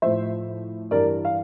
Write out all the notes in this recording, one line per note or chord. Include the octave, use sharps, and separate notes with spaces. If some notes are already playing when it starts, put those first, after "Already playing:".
A2 F3 C5 E5
G2 E3 A#4 D5
F5